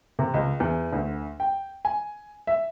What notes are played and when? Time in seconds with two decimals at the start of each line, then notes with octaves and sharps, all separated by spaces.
0.19 C3
0.34 C#2
0.60 E2
0.93 D2
1.40 G5
1.85 G#5
2.47 E5